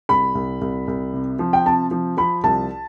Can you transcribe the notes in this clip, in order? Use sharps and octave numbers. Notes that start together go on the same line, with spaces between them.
C2 B5
C2
C2
C2
C3
F3
G5
C3 A5
F3
F3 B5
C2 A5